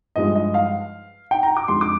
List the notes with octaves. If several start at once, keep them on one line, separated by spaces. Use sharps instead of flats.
G2 F3 G#3 D#5
D#5
F5
G5
A#5
D6
F2 D3 G#3 C6
D6